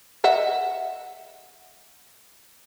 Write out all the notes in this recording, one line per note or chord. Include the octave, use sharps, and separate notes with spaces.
D#5 E5 F#5